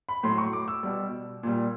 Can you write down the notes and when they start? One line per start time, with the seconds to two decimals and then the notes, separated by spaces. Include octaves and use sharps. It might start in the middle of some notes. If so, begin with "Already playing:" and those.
0.09 B5
0.23 A2 F#3 C6
0.38 C#6
0.53 D6
0.68 E6
0.83 B2 G3
1.43 A#2 G3